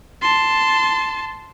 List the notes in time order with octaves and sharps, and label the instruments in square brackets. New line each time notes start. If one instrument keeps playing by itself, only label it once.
[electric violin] A5 C6